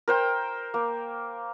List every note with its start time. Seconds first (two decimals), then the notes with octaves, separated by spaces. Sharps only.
0.08 A#4 C5 G5
0.74 A#3